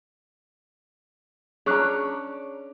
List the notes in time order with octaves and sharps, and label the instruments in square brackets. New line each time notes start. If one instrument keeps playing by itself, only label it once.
[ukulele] C#4 D4 A#5 [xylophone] G#4 C#6 F#6